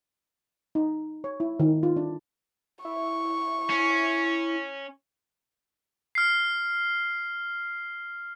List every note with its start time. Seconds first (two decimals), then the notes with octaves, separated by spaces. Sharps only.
0.75 D#4
1.24 C#5
1.40 E4
1.60 D#3
1.83 F4
1.96 D4
2.85 E4 C#6
3.70 C#4
6.15 F6 C7